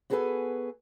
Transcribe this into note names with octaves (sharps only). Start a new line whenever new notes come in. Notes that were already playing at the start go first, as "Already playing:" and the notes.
B3 F#4 G#4 A4 B4 G#5